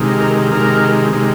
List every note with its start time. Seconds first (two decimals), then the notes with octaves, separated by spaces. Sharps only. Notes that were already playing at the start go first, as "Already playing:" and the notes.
Already playing: C3 D#3 G#3
0.20 A#4
0.52 C3 D#3 G#3 A#4
1.13 C3 D#3 G#3